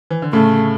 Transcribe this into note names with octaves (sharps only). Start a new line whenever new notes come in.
E3
D3
A2 C#3 A3